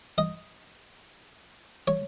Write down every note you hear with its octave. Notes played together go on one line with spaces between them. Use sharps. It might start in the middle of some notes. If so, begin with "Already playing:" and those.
D#5
C#5